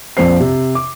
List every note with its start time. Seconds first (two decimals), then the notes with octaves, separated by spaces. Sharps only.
0.17 A#1 F2 C4 C5 C7
0.40 C3
0.75 D6